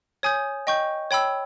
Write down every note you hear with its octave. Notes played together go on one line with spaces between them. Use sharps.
C#5 G#5 D#6 G6
D#5 G5 C#6 G6
C#5 G5 B5 E6